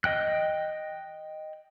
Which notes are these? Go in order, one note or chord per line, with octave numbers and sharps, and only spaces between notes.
D#5 G5 F#6